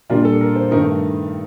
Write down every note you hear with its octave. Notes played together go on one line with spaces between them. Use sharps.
A#2 G3 D4 F4 A#4
A4
A#4
C5
G2 D#3 A3 D#4 A#4